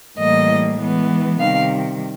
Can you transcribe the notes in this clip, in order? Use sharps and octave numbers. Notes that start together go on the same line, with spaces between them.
A2 E3 G3 A#3 D#5
E3 G#3 B3
C3 D#3 G3 F5